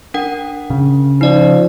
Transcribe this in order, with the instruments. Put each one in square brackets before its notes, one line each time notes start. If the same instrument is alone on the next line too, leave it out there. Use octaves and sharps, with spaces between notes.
[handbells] D4 A#4 F#5
[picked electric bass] C#3
[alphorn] F3 [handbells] D#4 D5